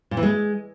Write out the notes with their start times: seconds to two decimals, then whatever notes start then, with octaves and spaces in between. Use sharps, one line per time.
0.11 A#2
0.17 E3
0.23 G#3